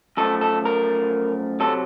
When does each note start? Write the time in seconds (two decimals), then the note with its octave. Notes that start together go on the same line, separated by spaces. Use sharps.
0.17 F#2 F3 A3 A4
0.41 A4
0.65 A#4
1.60 C3 F#3 A4